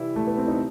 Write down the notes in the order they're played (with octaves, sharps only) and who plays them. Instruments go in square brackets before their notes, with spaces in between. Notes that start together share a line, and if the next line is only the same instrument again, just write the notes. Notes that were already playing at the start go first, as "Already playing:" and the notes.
Already playing: [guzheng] C3 E3 G3 [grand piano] E4
[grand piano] A3
B3
C4
D#4